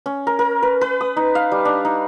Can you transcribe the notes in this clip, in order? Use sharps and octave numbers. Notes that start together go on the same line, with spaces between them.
C#4
A#4
A#4
B4
B4
D#6
D#4
F5
G3
D4
D#4